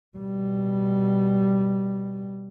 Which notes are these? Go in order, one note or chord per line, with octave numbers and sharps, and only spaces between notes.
B2 G3